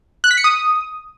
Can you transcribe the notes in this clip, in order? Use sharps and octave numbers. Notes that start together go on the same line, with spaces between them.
F#6
B6
C#7
D#6